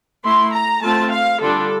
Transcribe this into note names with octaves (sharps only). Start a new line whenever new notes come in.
A3 E4 C6
A#5
A3 C4 F4 A5
F5
D3 G3 D4 F4 A4